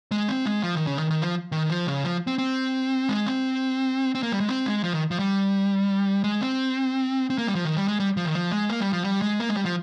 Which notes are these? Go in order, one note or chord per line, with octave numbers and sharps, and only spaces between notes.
G#3
C4
G#3
F3
D#3
C#3
D#3
D#3
F3
D#3
F3
C#3
F3
C4
C4
G#3
C4
C4
A#3
G3
G#3
C4
G#3
F3
D#3
F3
G3
G#3
C4
C4
A#3
G3
F3
D#3
G3
G#3
G3
F3
D#3
F3
G#3
A#3
G3
F3
G3
G#3
A#3
G#3
G3
F3